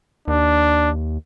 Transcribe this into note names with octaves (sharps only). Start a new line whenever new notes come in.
D#2 D4